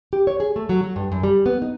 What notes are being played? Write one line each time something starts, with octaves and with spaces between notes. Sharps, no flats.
G4
C#5
G#4
A3
F#3
F#3
G2
F#2
G3
B3
D#4